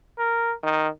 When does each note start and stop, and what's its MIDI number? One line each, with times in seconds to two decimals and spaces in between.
0.18 0.53 70
0.63 0.88 51